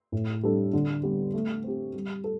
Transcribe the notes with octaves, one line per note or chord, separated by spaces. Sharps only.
A2
G3 D4 A4
D3
G3 B3
A3
C4 G4
G3
A4